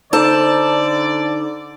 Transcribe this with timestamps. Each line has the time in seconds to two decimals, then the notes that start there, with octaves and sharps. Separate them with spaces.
0.13 D3 D#4 A4 C5 D5 A5